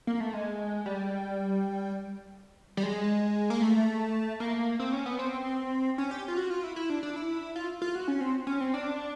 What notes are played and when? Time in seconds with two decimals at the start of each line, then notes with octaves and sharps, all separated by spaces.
0.07 A#3
0.20 A3
0.33 G#3
0.86 G3
2.77 G3
2.83 G#3
3.50 A#3
3.62 A3
4.40 A#3
4.79 C4
4.93 C#4
5.06 B3
5.19 C4
5.98 C#4
6.11 G4
6.28 F4
6.37 F#4
6.50 F4
6.64 E4
6.76 E4
6.90 D4
7.03 D4
7.16 E4
7.56 F4
7.82 F4
7.95 F#4
8.08 C#4
8.21 C4
8.47 C#4
8.61 C4
8.74 D4